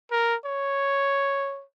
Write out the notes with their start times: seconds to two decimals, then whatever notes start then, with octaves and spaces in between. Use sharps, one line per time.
0.11 A#4
0.45 C#5